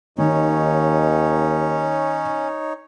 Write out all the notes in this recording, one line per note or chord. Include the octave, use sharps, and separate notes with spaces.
D#2 D#3 C#4 D#4 C#5